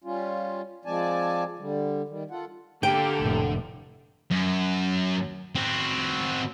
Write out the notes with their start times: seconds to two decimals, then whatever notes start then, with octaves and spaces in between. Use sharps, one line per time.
0.04 G3 C#4 F4
0.85 F3 G#3 C4 D5 G#5 A5
1.59 D3 G3
2.09 D#3 G3
2.31 F4 A4 F#5
2.83 D3 A#3 G4 A4 G5
3.19 F1 A2
4.31 F#2
5.55 C4 F#4